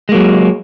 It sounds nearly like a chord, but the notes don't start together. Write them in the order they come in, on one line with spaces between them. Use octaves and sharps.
G#3 A#3 F#3